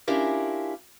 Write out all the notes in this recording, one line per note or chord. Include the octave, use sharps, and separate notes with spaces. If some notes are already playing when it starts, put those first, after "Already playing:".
C#4 D4 E4 F4 G4 A#4